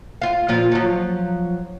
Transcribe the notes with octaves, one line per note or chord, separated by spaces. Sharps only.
F4 F5
A#2 F3 F4
F3 F#3